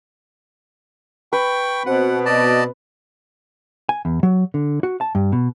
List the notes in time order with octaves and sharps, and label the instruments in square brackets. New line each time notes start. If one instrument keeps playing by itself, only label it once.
[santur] B4 [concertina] G5 C#6
[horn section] B2 [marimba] C4 C5 [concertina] F#5
[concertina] D5 D#5 A5
[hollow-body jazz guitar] G#5
E2
F#3
D3
F#4
A5
G2
B2